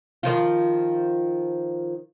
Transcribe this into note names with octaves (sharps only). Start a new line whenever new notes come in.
D#3 F3 F4